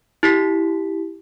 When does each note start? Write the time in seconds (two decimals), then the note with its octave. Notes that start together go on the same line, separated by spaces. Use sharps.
0.23 E4 G4 B6